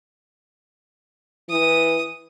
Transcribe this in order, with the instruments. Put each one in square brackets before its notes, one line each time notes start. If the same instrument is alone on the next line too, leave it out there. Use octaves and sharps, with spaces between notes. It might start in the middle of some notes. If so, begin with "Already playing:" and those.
[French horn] E3 [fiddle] D#6